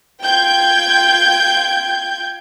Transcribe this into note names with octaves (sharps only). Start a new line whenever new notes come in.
F4 G5 G6 G#6